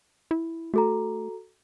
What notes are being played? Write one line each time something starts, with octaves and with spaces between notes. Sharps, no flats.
E4
A3 F#4 A4 A#5